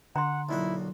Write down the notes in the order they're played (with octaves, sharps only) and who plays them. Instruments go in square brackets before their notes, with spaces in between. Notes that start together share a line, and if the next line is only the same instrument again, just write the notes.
[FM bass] D3 [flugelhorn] F#5 [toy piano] A#5 C6
[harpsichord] B1 A#2 F#4 [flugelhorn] E4